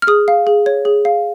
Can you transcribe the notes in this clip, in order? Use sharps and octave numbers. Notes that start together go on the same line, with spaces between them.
F6
G#4 D#6
F5
G#4
C#5
G#4
F5